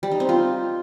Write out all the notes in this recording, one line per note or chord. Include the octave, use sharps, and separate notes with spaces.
G3
D#4
C4
F4